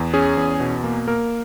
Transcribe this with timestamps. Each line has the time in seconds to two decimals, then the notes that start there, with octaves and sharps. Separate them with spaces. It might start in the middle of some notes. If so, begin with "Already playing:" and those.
Already playing: E2
0.14 C#4 G#4
0.37 E2
0.60 B2
0.84 A#3
1.07 A#3 A#4